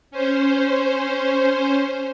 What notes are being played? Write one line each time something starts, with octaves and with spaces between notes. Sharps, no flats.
C#4 C5